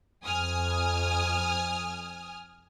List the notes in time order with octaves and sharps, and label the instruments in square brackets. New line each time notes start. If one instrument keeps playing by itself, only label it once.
[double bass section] F2 [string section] G#5 D#6 F6